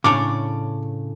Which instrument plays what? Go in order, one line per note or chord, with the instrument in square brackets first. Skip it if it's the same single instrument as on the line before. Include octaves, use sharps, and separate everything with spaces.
[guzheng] A2 D4 C#5 [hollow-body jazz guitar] C#3 [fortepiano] D6